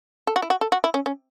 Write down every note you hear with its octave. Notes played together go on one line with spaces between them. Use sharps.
A4
F#4
E4
F#4
A4
F#4
E4
C#4
C#4